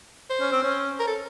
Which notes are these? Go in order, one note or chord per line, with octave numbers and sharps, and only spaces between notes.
C5
C#4
C4
C#4
A#4
A4